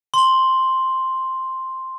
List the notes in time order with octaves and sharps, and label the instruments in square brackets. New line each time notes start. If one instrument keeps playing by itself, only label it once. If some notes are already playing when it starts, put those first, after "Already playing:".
[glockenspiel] C6 F#7